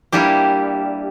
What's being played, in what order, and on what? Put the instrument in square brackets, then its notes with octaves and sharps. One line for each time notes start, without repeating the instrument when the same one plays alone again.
[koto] G3 A#3 D4 E4 G4